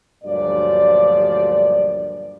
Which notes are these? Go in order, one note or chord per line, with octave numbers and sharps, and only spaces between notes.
D2 G2 A#2 F3 F#3 D5